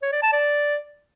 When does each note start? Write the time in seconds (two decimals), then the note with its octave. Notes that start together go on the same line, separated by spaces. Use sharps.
0.02 C#5
0.12 D5
0.22 A5
0.33 D5